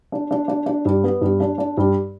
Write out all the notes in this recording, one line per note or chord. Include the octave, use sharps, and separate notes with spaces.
D4
D4
D4
D4
G2
B3
G2
D4
D4
G2